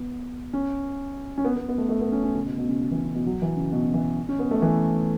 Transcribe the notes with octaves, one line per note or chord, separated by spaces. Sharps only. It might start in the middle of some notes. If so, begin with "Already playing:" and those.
Already playing: B3
C#4
C#4
B3
B3
B3
A3
A3
B3
C#4
C#4
C#3
B2
B2
C#3
C#3
E3
C#3
B2
F#3
E3
C#3
B2
C#3
E3
C#4
B3
A3
E3